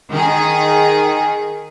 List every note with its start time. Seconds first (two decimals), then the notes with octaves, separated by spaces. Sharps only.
0.11 D#3 G#4